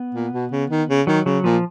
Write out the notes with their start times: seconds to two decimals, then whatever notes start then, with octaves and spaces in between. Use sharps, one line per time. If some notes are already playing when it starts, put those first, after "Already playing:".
Already playing: B3
0.15 A#2
0.33 B2
0.52 C#3
0.70 D#3
0.89 C#3
1.07 D#3 F#3
1.26 C#3 F#3
1.44 A#2 F3